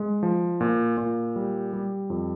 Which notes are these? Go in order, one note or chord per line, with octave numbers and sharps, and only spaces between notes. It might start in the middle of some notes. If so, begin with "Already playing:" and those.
Already playing: G#3
F3
A#2
A#2
G3
G3
F2